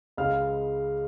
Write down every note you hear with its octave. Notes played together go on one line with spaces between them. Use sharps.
C#2 C#3 G#3 F5 F6